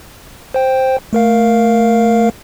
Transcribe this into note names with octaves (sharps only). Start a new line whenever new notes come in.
C5 G5
A3 A#4 F5